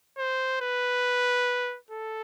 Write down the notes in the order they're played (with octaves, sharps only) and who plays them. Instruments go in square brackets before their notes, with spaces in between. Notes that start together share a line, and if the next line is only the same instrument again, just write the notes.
[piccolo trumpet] C5
B4
A4